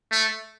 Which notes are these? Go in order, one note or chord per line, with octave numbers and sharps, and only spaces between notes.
A3